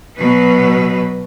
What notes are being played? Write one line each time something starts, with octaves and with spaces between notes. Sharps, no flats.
B2 F#3 B4